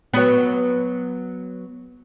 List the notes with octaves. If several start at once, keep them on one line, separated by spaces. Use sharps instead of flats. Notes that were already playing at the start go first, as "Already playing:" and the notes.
F#3 B3